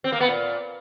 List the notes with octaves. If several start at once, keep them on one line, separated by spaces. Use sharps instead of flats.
C4
A#3
B3
A#2